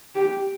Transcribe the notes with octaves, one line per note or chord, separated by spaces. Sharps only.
G4